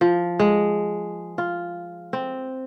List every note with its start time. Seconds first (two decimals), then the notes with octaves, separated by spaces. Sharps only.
0.01 F3
0.40 G#3
1.38 F4
2.13 C4